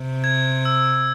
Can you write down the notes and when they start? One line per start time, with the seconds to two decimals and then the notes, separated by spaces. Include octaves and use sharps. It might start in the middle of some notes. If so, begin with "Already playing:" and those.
Already playing: C3
0.24 G#6
0.65 E6